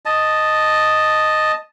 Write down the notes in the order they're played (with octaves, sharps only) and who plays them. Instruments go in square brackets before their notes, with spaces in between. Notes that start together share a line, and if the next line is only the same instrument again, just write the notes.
[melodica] D#5 A5